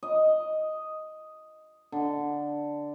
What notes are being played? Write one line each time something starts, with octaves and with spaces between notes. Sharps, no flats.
D#5
D3